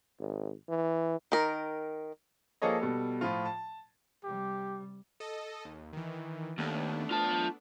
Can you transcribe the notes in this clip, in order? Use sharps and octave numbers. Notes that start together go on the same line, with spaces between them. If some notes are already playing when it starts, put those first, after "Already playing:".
G#1
E3
D#3 A#4
F3 A#3 G#4 A4 C#5 D#5
B2 G3 A4
A2 F3 F4
A5
C3 G3 G4
A4 D#5
D#2
D#3 E3
D#2 A3 B3 D4
F4 A5